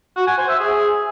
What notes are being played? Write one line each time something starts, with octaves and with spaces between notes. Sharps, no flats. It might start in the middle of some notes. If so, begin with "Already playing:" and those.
F#4
G#5
C5
E5
G#4